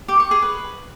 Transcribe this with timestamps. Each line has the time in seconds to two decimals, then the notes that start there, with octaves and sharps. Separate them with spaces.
0.08 G4
0.20 C#6
0.31 G#4
0.42 B4